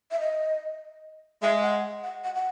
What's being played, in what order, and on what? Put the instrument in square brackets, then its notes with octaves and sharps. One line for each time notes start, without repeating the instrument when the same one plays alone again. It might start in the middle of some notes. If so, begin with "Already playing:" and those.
[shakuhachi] E5
D#5
[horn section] G#3 [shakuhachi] E5
[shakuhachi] F#5
F#5
F#5
F#5